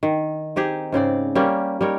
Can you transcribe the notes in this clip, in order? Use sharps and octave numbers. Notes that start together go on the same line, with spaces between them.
D#3
C4 D#4 G4 G#4
G#2 C#3 C4 D5
G3 A#3 C#4 G4
G3 D#4 A#4 C#5